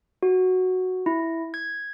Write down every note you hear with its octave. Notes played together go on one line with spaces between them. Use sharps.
F#4
E4
G#6